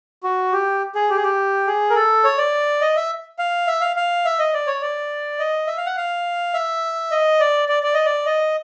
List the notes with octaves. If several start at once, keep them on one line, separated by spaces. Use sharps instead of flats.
F#4
G4
G#4
G4
G#4
G4
G#4
A#4
A4
C#5
D5
D#5
E5
F5
E5
F5
F5
E5
D#5
D5
C#5
D5
D#5
E5
F5
F#5
F5
E5
D#5
D5
D5
D5
D#5
D5
D#5